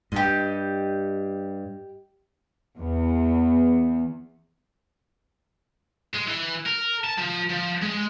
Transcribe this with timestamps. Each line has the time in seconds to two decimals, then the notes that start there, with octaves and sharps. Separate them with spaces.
0.12 G2 G4 D#5
2.78 E2
6.14 G#3
6.27 E3
6.66 A#4
7.04 A5
7.18 F3
7.50 F3
7.82 G#3